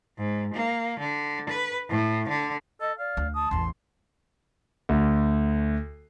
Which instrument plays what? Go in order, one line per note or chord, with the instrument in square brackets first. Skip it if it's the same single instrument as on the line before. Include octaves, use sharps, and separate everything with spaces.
[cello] G#2
A#3
D3
B4
A2
D3
[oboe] A4 [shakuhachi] D#5
[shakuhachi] D5 [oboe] F5
[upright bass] D2
[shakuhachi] A5 [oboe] D#6
[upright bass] A1 E2 [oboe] C6
[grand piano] D2